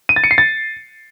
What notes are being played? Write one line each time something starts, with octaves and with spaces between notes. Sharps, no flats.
D#7
A6
C#7
C7
A6